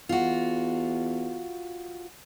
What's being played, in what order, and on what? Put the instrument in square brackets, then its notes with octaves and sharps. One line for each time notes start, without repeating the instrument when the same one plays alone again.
[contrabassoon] E2 [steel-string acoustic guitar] F4 F#4